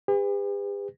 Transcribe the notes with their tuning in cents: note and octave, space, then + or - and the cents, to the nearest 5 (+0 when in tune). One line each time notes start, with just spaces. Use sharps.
G4 +45 B4 +30